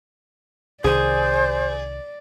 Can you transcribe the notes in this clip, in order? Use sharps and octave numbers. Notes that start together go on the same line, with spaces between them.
C2 D#3 G#4 C5 D5